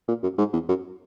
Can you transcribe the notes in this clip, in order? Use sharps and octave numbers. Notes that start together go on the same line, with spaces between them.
A#2
F#2
G#2
E2
F#2